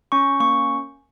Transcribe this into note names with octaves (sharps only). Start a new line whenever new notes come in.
C#4 C#6
A#3 C#6